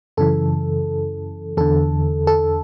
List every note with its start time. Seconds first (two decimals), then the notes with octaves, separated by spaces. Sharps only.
0.17 F#2 C#3 E3 A4
1.57 E2 D3 A4
2.27 A4